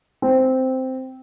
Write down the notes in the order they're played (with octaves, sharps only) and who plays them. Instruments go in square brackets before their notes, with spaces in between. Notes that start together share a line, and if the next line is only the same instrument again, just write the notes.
[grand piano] C4